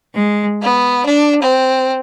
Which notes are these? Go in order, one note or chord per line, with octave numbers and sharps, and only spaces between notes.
G#3
B3
D4
C4